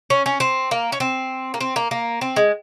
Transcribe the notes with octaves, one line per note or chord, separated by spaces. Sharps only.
C#4
C#4
C4
A#3
C#4
C4
A#3
C4
A#3
A#3
C4
G#3